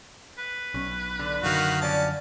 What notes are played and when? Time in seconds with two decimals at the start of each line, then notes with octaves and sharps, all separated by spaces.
0.38 B4
0.74 B1 C#4
1.19 D3
1.44 F#2 D3 D#3 F#3 F#4 A#4 F5
1.81 F3 B3 C#4 D5 A5